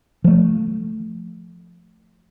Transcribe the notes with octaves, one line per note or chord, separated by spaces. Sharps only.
F3 A3